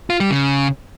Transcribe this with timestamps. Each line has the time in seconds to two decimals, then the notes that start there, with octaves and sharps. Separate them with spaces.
0.10 F4
0.20 G3
0.31 C#3